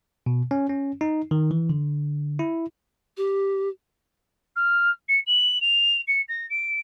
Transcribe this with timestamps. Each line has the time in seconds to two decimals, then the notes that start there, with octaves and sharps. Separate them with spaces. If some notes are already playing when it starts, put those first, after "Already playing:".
0.26 B2
0.51 C#4
0.69 C#4
1.01 D#4
1.31 D#3
1.51 E3
1.70 D3
2.39 E4
3.17 G4
4.56 F6
5.08 C#7
5.26 F#7
5.61 F7
6.07 C#7
6.28 A#6
6.50 D7